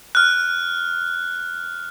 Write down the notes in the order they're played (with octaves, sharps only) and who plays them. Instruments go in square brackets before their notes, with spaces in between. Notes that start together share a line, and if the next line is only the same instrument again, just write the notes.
[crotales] F6 F#6